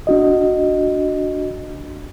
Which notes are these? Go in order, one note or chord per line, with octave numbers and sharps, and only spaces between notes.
D4 F#4 D#5